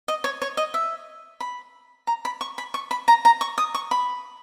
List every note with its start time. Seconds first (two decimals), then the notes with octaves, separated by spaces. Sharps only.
0.08 D#5
0.24 C#5
0.42 C#5
0.57 D#5
0.74 E5
1.40 B5
2.07 A#5
2.25 B5
2.41 C#6
2.58 B5
2.74 C#6
2.91 B5
3.08 A#5
3.25 A#5
3.41 C#6
3.58 D#6
3.74 C#6
3.91 B5